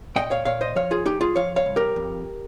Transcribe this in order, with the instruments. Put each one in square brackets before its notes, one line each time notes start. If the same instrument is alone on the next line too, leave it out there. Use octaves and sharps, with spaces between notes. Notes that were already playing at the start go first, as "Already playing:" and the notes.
[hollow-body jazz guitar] A#2 D#5 G5
C#5 F5
A#2 C#5 F5
C5 D#5
F3 C#5 F5
F4 G#4
C2 D#4 G4
F4 G#4
F3 C#5 F5
C#5 F5
C2
G4 A#4
F2